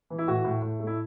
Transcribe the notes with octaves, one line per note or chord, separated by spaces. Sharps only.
E3
E4
A2 F#4
A2
A2
A3
E4